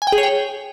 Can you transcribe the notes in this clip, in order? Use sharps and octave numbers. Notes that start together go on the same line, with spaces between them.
G#5
G5
G#4
C#5
G5